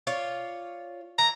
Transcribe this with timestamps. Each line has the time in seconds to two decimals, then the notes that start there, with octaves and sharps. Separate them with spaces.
0.07 F4 C#5 D5
1.18 E3 A#5